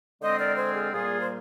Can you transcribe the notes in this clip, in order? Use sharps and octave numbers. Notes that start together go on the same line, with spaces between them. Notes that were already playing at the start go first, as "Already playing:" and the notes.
D3 G#3 C4 C5 D#5
A#4 D5
G#4 C5
F4 G#4
A#2 G3 A#3 F4 G#4
C5